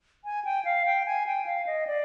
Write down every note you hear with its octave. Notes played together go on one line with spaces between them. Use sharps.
G#5
G5
F5
G5
G#5
G5
F5
D#5
D5